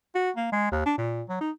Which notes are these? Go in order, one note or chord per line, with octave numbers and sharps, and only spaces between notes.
F#4
A#3
G#3
D#2
D4
A#2
F#3
D#4